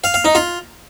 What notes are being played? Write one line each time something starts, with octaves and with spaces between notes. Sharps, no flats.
F5
F5
D#4
F4